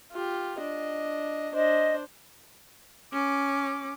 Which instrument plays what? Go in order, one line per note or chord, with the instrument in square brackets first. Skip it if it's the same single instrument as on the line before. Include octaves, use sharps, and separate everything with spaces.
[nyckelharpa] F4 G4
D4 D#5
[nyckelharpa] D4 C5 [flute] D#5
[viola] C#4 D6